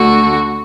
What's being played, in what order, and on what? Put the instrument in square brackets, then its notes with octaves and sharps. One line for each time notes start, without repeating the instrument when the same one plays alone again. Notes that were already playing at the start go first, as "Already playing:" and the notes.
Already playing: [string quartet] D2 D3 F#4